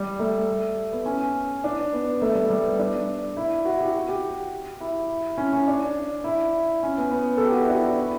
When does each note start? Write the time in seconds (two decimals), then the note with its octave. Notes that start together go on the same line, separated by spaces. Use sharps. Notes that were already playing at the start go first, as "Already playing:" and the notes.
Already playing: G3
0.19 A3
0.92 B3
1.06 C#4
1.64 D4
1.93 B3
2.22 A3
2.35 G3
2.50 G3
2.65 B3
2.79 D4
3.37 E4
3.65 F#4
3.80 G4
3.94 F#4
4.08 G4
4.80 E4
5.38 C#4
5.53 C#4
5.68 D4
6.24 E4
6.83 C#4
6.97 B3
7.11 B3
7.37 A4
7.45 G4
7.52 F#4
7.61 E4
7.69 D4
7.98 E4